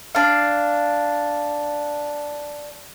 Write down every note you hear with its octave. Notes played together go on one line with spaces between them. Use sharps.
D4 F5